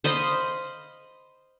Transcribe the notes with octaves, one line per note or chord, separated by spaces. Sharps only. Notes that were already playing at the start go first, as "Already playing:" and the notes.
C5 D#5 F5 B5